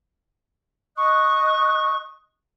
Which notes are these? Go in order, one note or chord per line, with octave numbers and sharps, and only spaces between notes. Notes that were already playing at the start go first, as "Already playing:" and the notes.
D#5 C#6 D#6 F#6